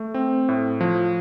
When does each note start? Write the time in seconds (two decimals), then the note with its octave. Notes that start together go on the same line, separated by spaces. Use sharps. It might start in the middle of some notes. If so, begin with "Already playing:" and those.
Already playing: A3
0.14 C4
0.49 A2
0.81 F3